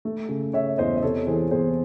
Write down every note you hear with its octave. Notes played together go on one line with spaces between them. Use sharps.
A3
C#3
C#3 C#5 E5
E2 C5 D#5
D#5
C3 A4 C#5
E3 G#4 C5
E2 G#4 C5